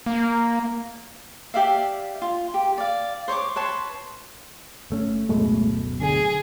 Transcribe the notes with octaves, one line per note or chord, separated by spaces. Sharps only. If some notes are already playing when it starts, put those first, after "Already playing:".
A#3
G4 D5 E5 F5
F4
G4
D5 F5
C5 C#5 C#6 D6
B4 C#5 A5 C6
G1 A3 C#4
D1 F#2 B2 G#3 A3
D3 G#4